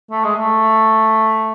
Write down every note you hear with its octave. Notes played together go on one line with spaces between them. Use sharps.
A3
G#3
A3